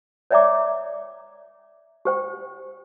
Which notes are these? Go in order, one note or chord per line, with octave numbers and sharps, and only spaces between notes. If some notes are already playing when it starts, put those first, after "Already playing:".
C#5 D5 E5 G5 A#5 D6
G4 C5 G5